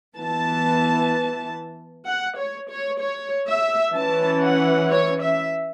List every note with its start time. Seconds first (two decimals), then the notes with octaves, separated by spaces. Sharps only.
0.15 E3 B3 A5
2.06 F#5
2.37 C#5
2.69 C#5
3.00 C#5
3.48 E5
3.94 E3 C#4 A5
4.42 F#5
4.89 C#5
5.21 E5